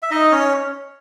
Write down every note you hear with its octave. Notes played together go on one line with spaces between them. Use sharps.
E5
D#4 D#5
C#4 C#5